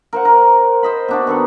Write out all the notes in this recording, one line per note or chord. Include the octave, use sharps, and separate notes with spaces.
A#4 C5 F#5
A#4
C5 D#5 B5
B2 D4 F#4
D#3 B3 A4